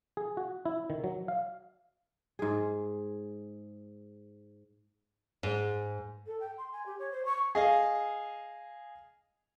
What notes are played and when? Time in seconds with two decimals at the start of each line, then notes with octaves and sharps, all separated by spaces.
0.17 G#4
0.37 F#4
0.65 E4
0.90 D#3
1.04 F#3
1.28 F5
2.39 G#2 G#4
5.43 G#2
6.26 A4
6.40 G5
6.57 C6
6.72 G#5
6.85 G4
6.99 C#5
7.11 C5
7.25 C#6
7.55 G#4 D#5 F5